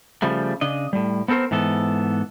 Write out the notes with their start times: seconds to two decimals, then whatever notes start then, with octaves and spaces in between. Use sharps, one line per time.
0.22 C#3 F3 G3 A3
0.61 C#3 D4 D#5
0.93 A2 G3
1.28 B3 C4 A4 A#4 C5
1.51 G#2 E3 B3 A4